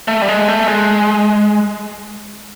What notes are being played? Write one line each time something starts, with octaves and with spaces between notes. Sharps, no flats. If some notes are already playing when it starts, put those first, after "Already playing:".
A3
G3
G#3
A3
G#3